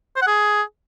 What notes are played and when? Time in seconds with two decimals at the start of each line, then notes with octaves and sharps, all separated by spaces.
0.17 C5
0.22 F#5
0.27 G#4